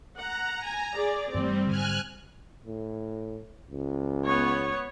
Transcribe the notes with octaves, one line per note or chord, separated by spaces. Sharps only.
F#5 A#5
G#5
G#4 D5
G2 E3 G3 A3 C4
G#2 D3 G#5 F6 F#6
A2
C#2
B3 C#5